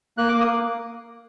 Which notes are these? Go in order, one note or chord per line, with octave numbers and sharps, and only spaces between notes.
A#3 F#6
A#3 D6
D#6
A#3